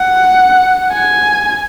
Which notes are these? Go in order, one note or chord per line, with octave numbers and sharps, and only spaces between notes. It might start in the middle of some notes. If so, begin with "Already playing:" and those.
Already playing: F#5
G#5